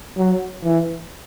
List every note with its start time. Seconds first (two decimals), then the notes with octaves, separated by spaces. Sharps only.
0.18 F#3
0.64 E3